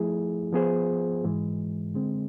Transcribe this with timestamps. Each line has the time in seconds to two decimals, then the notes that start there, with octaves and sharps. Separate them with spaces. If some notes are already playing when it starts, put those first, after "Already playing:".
Already playing: F3 A3 E4 G#4
0.53 F3 B3 F4 G#4 C5
1.24 G#2 E3 G#3
1.94 D3 G#3 C4